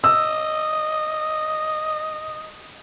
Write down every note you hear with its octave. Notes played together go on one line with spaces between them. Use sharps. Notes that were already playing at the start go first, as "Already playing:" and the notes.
D#5 E6